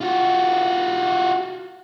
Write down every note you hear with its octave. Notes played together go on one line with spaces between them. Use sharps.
F4 F#4